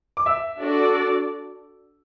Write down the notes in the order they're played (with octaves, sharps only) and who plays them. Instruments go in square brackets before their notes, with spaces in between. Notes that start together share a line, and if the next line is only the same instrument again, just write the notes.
[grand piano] D6
E5 E6
[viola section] D4 F#4 A4 D5